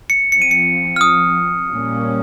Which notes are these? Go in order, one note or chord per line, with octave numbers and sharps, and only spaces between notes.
C#7
F3 C4 C#7
D#7
C#7
F6
D#6
A#2 G3 A#3 C#4